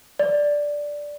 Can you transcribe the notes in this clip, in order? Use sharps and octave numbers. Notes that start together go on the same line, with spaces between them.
D5